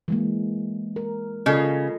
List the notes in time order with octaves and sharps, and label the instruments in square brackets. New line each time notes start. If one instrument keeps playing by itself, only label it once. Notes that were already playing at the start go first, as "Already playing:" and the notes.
[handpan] E3 G#3 A#3
A#4
[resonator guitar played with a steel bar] C#3 [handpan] F4 A4 D#5